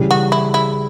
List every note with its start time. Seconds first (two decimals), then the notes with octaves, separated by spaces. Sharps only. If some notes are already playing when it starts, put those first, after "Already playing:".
Already playing: C#3 E3 G3
0.11 F#4
0.32 E4
0.54 E4